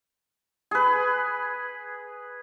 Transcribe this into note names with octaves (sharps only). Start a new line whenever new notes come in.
G#4 B4